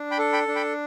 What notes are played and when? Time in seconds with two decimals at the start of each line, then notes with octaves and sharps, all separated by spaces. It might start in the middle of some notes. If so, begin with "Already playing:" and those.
Already playing: D4
0.11 G5 B5
0.19 A4
0.33 G5 B5
0.48 D4
0.55 G5 B5